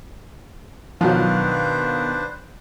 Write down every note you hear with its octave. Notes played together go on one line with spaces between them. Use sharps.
B2 D#3 F3 F#3 D4 B4 C5 F5